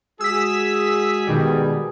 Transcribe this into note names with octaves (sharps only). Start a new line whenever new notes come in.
G#3 F#4 G#4 E6 B6
B2 D#3 G3